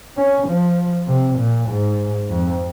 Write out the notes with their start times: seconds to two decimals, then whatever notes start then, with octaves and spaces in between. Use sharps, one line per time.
0.17 C#4
0.47 F3
1.08 C3
1.38 A#2
1.69 G#2
2.29 F2